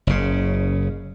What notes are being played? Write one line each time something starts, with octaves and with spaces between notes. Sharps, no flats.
F#1 C#3